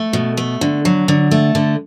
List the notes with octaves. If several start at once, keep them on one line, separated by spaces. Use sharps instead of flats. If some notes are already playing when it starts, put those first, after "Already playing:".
Already playing: A3
B2
A3
D3
F#3
D3
A3
D3